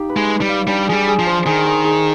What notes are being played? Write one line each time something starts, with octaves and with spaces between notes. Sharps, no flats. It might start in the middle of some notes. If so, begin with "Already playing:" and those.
Already playing: D#4 G4 F5
B4
G#3
B4
G3
F5
G3 D4
F3 G#4
G3
G#4
F3
C5
D#3 G#4
G#4
G#4